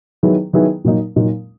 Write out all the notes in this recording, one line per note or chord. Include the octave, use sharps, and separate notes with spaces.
D#3 F#3 B3 E4 G#4
D#3 F#3 B3 E4 G#4
A#2 F#3 A#3 D#4
A#2 F#3 A#3 D#4